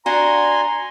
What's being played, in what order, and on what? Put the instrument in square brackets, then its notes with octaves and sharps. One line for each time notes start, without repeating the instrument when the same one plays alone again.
[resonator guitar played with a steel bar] D4 F#4 [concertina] G#5 C6 [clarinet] A#5